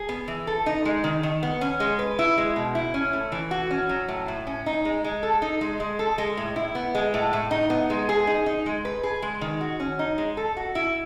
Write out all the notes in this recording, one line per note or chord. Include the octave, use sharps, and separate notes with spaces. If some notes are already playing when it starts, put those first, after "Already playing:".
Already playing: G#4
B3
E3
A4
D#4
G#3
D#3
D#3
B3
C#4
G#3
B4
E4
G#3
B2
E4
C#4
A3
E3
F#4
C#4
F#3
A2
A2
C#4
D#4
G#3
G#3
A4
D#4
G#3
G#3
A4
G#3
A2
E4
B3
G#3
A2
A2
D#4
B3
G#3
G#4
D#4
D#4
G#3
B4
G#4
G#3
D#3
F#4
C#4
D#4
G#3
A4
F#4
E4